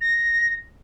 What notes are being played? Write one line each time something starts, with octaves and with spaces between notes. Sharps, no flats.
A#6